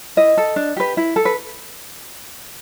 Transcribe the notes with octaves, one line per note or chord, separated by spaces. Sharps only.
E4 D#5
A4
D4
G4 B4
E4
A4
B4